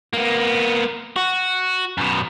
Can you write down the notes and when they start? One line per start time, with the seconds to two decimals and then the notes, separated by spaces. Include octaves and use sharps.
0.13 A#3 B3
1.16 F#4
1.98 F#2 B2